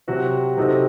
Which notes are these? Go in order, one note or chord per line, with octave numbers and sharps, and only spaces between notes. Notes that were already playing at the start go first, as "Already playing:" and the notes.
C3 F#3 C4 F#4
C3 F#3 C4 D#4 A4